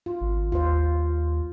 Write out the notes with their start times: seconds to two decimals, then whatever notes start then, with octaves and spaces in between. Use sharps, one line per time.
0.06 F4
0.21 G#1
0.52 D#2 F4 C5